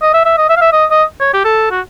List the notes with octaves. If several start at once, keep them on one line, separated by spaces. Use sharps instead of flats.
D#5
E5
E5
D#5
E5
F5
E5
D#5
D#5
C#5
G4
A4
F#4